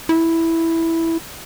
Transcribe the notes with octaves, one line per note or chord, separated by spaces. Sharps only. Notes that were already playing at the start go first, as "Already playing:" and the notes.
E4